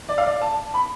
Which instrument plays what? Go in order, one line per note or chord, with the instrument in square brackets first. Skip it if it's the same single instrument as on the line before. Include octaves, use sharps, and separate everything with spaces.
[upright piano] D5
F5
D5
A5
B5